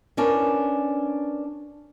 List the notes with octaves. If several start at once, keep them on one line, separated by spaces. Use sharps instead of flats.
B3 C#4 D4 A#4